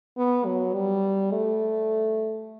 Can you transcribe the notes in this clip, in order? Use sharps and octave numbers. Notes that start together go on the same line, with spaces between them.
B3
F#3
G3
A3